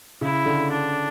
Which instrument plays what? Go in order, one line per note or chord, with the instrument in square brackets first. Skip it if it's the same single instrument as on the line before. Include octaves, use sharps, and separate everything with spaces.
[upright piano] C#3 [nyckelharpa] E4
[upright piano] D3
[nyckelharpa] D4